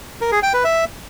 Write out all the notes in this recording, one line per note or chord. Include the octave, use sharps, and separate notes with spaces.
A#4
G#4
G5
B4
E5